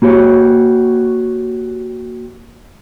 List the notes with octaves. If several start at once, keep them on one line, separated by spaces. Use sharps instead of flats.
A#3 F#4 G4 C#5